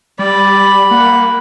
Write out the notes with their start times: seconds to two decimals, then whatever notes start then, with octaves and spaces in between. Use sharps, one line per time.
0.19 G3 D5 B5
0.91 A#3 F#5